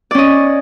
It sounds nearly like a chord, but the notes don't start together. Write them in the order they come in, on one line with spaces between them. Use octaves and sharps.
D5 C#4 D#5